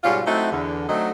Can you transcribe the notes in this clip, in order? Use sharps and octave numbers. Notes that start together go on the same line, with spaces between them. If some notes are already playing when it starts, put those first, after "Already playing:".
G#2 B2 G3 C#4 F4
F#3 A3 C4 D#4 E4 F#4
E2 D3
D3 F#3 A3 C4 D#4